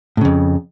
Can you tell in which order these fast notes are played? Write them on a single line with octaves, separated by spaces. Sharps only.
A2 C#3 F2